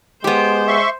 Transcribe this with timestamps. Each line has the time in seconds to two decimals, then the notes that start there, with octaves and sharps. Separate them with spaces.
0.24 G#3 B3 G4 C5
0.67 E5 C6 C#6